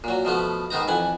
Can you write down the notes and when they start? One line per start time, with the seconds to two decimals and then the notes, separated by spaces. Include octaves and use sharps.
0.04 A#2 F#3
0.25 B2 F3 A3 B3
0.70 G#2 D#3 B3 D#4 A#5
0.88 F2 E3 F#5 G#5